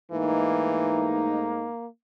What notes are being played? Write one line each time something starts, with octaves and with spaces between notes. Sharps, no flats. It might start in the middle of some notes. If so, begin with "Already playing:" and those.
G#2 E3 A3 A#3 D#4